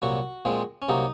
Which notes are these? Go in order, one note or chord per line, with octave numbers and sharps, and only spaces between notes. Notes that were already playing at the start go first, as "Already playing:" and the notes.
C2 A#2 F#3 F#4
A#2 F3 G#3 C4
C#4
C2 C3 F#3 A#3 D#4